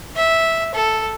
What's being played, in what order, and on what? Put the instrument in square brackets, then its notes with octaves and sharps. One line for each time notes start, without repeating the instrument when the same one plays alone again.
[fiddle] E5
A4